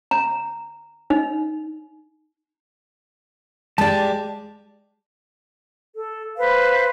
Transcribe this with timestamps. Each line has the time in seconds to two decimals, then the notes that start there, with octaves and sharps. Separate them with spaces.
0.11 A#5
1.10 D#4
3.78 G#3 G4 D5 A5
5.95 A4
6.37 B4 C5 F5